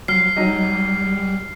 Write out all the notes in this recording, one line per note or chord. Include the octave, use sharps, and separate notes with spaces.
F#3 F6 C7
F#3 G3 D#4 D#5